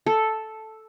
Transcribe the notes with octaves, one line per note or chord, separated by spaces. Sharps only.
A4